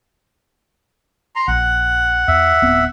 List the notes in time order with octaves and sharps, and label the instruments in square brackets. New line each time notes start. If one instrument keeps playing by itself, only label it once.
[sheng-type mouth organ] A#5 C6
[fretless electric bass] A#1 [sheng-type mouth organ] F#5
[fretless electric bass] E2 [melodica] E5
[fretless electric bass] D1 B3 C4